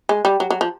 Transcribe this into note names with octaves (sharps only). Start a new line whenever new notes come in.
G#3
G3
F#3
F#3
F3